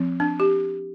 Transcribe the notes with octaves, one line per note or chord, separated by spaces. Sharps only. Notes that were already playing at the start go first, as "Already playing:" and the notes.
Already playing: F3 C4
D4
G4